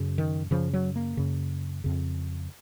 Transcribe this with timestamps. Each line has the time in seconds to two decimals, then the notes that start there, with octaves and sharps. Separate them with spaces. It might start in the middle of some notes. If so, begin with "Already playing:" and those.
Already playing: F#2 C#3
0.18 D#3
0.51 F#2 C#3 F3
0.73 F#3
0.96 A#3
1.17 F#2 C#3
1.84 F2 C#3